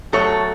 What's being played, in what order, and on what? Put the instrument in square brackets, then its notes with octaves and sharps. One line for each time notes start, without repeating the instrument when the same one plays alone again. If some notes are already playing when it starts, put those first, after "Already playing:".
[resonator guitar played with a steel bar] B2 F#3 A3 A4 C#5